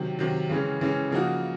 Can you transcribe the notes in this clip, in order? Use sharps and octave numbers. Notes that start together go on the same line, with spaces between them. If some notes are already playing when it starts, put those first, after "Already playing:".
Already playing: C3 D#3 F#3
C3 D#3 F#3
C#3 E3 G#3 C#4
C#3 E3 G#3 C#4
C#3 F3 A#3 D#4 F#4